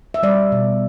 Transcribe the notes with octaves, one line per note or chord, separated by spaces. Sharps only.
E5
G3 D5
B2